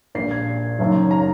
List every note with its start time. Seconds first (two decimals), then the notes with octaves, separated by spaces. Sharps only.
0.15 A#1 A#2 C7
0.31 G#6
0.79 F#1 F#2 D#3
1.11 A#5